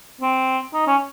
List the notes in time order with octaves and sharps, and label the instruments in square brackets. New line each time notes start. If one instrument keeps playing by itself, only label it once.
[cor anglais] C4
D#4
C#4